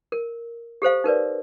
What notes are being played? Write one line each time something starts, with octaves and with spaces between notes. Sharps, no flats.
A#4
G4 A4 C5 F5
D#4 A#4 B4 D5